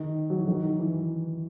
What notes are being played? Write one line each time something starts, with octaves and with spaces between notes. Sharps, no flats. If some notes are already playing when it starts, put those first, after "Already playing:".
Already playing: D#3
F#3
E3
D#3
E3